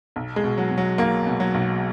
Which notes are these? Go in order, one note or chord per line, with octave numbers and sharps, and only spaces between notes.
B1
G#3
B2
F#3
B2
F#3
B1 A#3
B2
F#3
B1